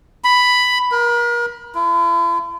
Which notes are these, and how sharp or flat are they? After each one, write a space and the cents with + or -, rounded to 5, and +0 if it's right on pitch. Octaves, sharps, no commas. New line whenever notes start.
B5 +5
A#4 +35
E4 +45